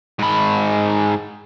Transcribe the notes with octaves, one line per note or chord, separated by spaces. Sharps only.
G#2 B5